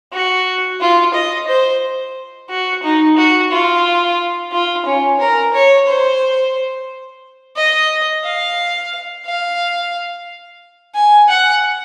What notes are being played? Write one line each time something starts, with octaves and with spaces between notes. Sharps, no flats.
F#4
F4
D#5
C5
F#4
D#4
F#4
F4
F4
C#4
A#4
C#5
C5
D#5
F5
F5
G#5
F#5